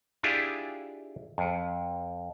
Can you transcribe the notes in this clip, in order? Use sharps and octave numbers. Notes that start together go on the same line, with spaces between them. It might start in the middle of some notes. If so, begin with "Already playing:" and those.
D4 E4 F4 G4 G#4
F2